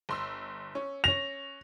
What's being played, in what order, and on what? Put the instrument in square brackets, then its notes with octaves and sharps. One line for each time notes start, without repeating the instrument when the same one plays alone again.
[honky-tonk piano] G1 C6 E6
C#4
[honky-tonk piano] C#4 A#6 [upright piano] F7